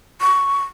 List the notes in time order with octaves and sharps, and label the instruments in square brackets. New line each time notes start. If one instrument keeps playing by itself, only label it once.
[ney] C#6